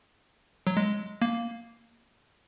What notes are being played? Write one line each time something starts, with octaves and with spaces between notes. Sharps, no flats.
F#3
G#3
A#3